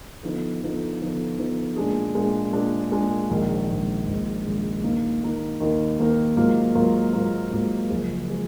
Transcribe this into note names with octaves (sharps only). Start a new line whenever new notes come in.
D3 F3 B3 D#4
D3 F3 B3 D#4
D3 F3 B3 D#4
D3 F3 B3 D#4
A#2 G#3 D4 G#4
A#2 G#3 D4 G#4
A#2 G#3 D4 G#4
A#2 G#3 D4 G#4
A#1 G#2 D#3
A#1 G#2 D#3
A#1 G#2 D#3
A#1 G#2 D#3
D#2 D#3 A#3 D#4 A#4
D#2 D#3 A#3 D#4 A#4
D#2 D#3 A#3 D#4 A#4
D#2 D#3 A#3 D#4 A#4
G#2 F#3 A#3 F4 A#4
G#2 F#3 A#3 F4 A#4
G#2 F#3 A#3 F4 A#4
G#2 F#3 A#3 F4 A#4
F#1 F#2 F3 G#3
F3 G#3